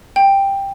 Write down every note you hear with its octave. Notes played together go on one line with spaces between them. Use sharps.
G5